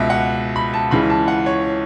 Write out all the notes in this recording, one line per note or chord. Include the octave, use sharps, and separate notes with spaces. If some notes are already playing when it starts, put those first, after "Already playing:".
Already playing: C#2 B2 E5
F#5
B5
A5
C#2 C#3 E3 B5
A5
F#5
C#5